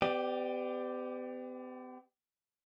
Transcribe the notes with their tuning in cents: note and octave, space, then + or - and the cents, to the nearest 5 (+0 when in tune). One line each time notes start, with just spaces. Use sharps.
B3 +45 G4 +0 D5 +20